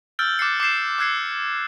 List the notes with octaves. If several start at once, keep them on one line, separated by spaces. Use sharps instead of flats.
E6 F6 G6 A6 D7 F#7
D6 F#6 A6 C7 C#7
D6 G6 C7 E7
E6 F#6 G#6 C7 C#7